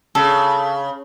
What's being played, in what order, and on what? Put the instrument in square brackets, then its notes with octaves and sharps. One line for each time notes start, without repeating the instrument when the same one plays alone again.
[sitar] C#3 [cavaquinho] A4